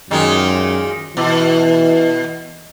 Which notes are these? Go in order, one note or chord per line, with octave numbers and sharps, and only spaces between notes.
F#2 A#2 D#3 G#3
B2 E3